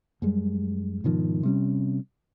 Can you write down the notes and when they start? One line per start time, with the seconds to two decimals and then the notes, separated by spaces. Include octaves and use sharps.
0.22 F#2 G3 G#3
1.04 G#2 B2 D#3 F3
1.43 C3 G3 C#4